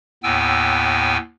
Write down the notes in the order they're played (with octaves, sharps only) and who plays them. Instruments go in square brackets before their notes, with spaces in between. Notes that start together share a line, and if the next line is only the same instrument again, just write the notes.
[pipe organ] D#2 A2 B3 G5 G#5 E6